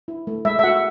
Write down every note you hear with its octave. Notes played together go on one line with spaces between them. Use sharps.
E4
A3
G#3 E5
E5
F#4 F#5